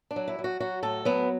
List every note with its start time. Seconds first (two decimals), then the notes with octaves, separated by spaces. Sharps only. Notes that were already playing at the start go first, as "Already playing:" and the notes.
0.11 D4
0.16 F#3
0.28 E4
0.39 F#3
0.44 F#4
0.60 F#3 F#4
0.83 A2 A4
1.05 F#3 B3